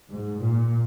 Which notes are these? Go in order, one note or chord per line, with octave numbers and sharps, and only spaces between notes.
G#2
A#2